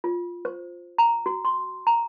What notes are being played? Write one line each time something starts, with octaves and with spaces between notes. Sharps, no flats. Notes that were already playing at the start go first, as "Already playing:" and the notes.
F4
C5
A#5
F#4
C6
A#5